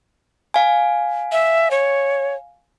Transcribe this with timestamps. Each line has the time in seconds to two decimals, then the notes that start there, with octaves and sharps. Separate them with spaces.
0.54 F5 G#5
1.32 E5
1.71 C#5